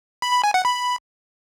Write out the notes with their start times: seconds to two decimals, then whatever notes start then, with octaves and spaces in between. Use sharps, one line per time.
0.22 B5
0.33 B5
0.44 G#5
0.54 F#5
0.65 B5